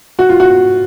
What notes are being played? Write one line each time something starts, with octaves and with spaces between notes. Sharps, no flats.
F#4
F4
F#4